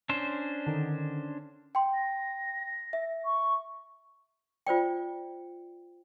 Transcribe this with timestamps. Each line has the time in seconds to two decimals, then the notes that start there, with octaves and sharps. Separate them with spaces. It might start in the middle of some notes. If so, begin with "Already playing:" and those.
0.09 C#4 D4 C5
0.67 D3 D#3
1.75 G5 C6
1.94 A#6
2.93 E5
3.24 C#6
4.67 F4 C5 D5 G5